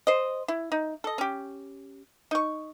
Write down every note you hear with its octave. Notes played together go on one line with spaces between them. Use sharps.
C5 D#5
E4
D#4
A4 D#5
C#4 G4
D#4 C#6